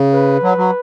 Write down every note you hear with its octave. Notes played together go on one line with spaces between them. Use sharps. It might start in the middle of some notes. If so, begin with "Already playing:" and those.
Already playing: C#3
B4
F#3
F#3